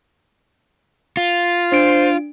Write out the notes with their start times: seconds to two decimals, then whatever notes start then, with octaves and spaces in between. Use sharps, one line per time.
1.17 F4
1.72 D4 C5 D7